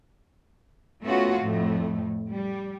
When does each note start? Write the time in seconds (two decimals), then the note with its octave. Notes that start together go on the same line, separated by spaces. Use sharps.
1.03 A3 B3 C#4 F4 F#4
1.39 F2 A2 A3
2.30 G3